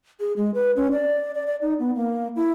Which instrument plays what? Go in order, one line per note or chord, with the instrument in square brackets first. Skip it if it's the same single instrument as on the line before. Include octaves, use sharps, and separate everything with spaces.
[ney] G#4
G#3
B4
C#4
D5
D5
D5
D#4
B3
A#3
E4